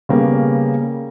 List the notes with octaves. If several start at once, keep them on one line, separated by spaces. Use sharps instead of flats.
C#3 G3 A#3 B3